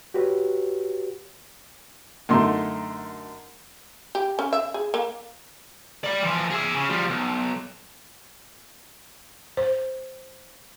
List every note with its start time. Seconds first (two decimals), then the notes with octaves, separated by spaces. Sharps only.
0.14 F#4 G4 B4 C#5
2.29 F#2 D3 A3 D#4 C6
4.15 G4
4.39 C#4
4.53 E5
4.74 G#4
4.94 A#3
6.04 D5 B5
6.22 E3 F3
6.50 G#4 E5
6.74 C#3
6.89 F3 G3
7.08 B1
9.57 C5